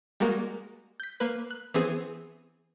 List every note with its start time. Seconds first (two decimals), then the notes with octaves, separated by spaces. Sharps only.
0.20 G3 G#3 A#3 F#4 A#4
1.00 G6 B6
1.20 A#3 B4
1.50 F#6
1.74 E3 B3 C4 G#4